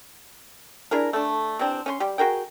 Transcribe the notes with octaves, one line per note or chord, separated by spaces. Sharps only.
D4 E4 G#4 A#4
A3 D4
C3 E3 C4 D4
C#4 F4 C6
G3 G4
F#4 G#4 A#4 G5